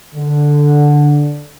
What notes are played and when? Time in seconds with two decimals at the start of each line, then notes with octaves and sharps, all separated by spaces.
0.15 D3